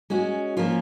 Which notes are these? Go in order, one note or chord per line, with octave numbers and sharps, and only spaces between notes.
G#3 C#4 F#4
F3 A#3 C#4 F4